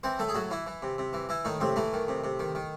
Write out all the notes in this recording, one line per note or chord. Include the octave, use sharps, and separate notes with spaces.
E3 C4 C5
A2 A3 A4
G#4
A2 F#3 F#4
E3 E4
E3
C3
C3
E3
E3 E4
A2 D#3 D#4
A2 C3 C4
A2 E3 A3
D#3
C3
C3
D#3
D#3